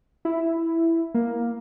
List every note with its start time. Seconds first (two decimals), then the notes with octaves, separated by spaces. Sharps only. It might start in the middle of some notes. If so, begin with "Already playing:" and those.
0.25 E4
1.14 A#3